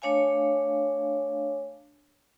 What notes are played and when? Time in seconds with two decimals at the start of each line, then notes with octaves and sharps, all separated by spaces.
0.02 A3 D4 C#5 F5 G#5